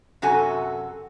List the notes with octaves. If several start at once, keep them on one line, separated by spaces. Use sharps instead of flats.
F#2 C3 F#4 A4 G#5